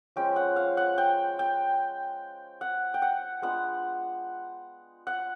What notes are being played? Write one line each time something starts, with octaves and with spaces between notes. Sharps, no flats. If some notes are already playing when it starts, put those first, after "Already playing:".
F3 G#3 C#4 G5
F#5
F5
F#5
G5
G5
F#5
G5
F#5
G#3 B3 D4 F4 F#5
F#5